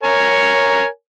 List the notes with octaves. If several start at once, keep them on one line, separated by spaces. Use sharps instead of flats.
A#4 C#5 G#5